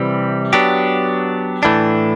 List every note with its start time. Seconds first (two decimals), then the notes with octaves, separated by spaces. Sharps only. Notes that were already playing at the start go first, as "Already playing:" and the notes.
Already playing: C3 E3 G3 C4
0.53 F#3 B3 D4 G4
1.63 A2 E3 A3 D4